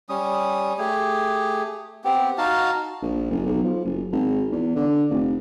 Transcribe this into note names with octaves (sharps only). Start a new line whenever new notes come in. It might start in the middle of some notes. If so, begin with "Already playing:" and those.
G3 C#4 D#6
A3 G4 G#4
B3 C4 G4
D#4 F#4 F5 A5
A#1
F#1
B1
F3
F#1
G#1
E2
D3
F1